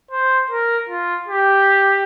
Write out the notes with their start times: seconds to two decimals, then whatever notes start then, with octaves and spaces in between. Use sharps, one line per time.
0.11 C5
0.51 A#4
0.89 F4
1.28 G4